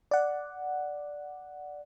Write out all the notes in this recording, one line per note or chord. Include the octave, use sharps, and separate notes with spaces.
D5 F#5